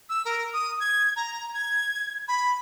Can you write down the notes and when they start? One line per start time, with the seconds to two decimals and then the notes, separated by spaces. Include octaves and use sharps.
0.09 E6
0.25 A#4
0.53 D#6
0.80 G#6
1.16 A#5
1.54 G#6
2.28 B5